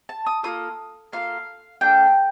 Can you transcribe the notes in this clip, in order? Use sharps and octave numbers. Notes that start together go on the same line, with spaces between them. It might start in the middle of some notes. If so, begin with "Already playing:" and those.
A5
D#6
A#3 F4 A4 D#6
A#3 F4 A4 F5
A#3 D4 A4 G5